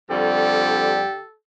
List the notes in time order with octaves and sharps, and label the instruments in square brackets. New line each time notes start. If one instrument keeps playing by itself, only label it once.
[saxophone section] F2 G3 [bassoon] D3 [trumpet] G4 [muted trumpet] A4